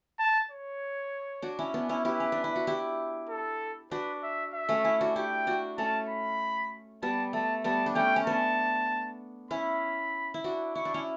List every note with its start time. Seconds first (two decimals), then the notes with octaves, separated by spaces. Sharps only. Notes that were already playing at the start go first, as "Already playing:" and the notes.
0.19 A5
0.50 C#5
1.42 D4 F#4
1.59 C#4 E4
1.74 B3 D4
1.89 C#4 E4
2.04 E4 G4 B4
2.20 C#4
2.32 D4
2.44 E4
2.55 F#4
2.67 E4 G4
3.29 A4
3.91 D4 F#4 B4
4.23 E5
4.53 E5
4.69 A3 C#4
4.84 C#4 E4
5.01 D4 F#4
5.16 E4 G4 G5
5.47 D4 F#4
5.78 A3 C#4 A5
6.09 B5
7.02 G3 B3 A5
7.33 A3 A5
7.64 G3 B3 A5
7.86 D4
7.95 A3 C#4 G5
8.16 C#4
8.26 B3 D4 A5
9.51 C#4 E4 B5
10.34 E4
10.44 D4 F#4
10.75 E4 C#6
10.85 D4
10.94 C#4 E4